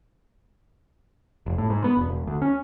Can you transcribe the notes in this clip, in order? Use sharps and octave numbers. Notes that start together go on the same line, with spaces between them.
F1
A2
G#2
B3
E1
E1
D2
C#4